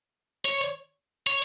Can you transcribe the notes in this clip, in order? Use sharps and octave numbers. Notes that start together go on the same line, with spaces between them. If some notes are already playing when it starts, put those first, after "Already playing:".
C#5
C#5